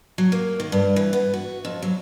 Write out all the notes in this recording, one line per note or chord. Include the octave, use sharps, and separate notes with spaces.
F#3
A#3
D#3
G2
E3
B3
F#4
F2
F#3